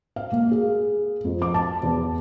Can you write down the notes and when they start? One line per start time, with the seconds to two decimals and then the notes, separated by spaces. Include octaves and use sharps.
0.16 F5
0.32 A#3
0.51 G#4
1.24 F2
1.42 D6
1.54 A5
1.83 E2